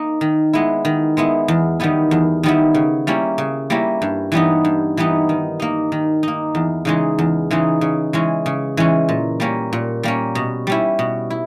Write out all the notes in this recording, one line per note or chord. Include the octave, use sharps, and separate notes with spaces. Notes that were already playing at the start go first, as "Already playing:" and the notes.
Already playing: A#3 D#4
D#3
G#3 B3 E4
D#3
G#3 B3 E4
E2
D#3 G3 B3 E4
E2
D#3 G3 B3 E4
C#3
G3 A#3 C#4 E4
C#3
G3 A#3 C#4 E4
G2
E3 G3 B3 D#4
G2
E3 G3 B3 D#4
D#3
A#3 D#4
D#3
A#3 D#4
E2
C#3 E3 G#3 D#4
E2
C#3 E3 G#3 D#4
C#3
E3 G#3 C#4
C#3
E3 G#3 C#4
A#2
G3 A#3 C#4
A#2
G3 A#3 C#4
B2
G3 C#4 E4
B2
E4